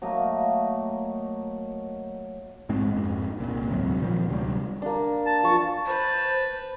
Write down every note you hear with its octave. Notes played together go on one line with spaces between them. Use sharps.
F#3 A3 A#3 D#5
A1 G#2 G#3 C4
F2 G#2
C2 A#2
G#1 D2 C3 F#3
A#2 D#3 F3 G3
D2 C3 F#3 G3
A#3 D4
A5
F3 C#6
B4 C5 A5